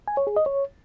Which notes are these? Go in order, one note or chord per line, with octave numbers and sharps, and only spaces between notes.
G#5
C#5
G#4
D#5
C#5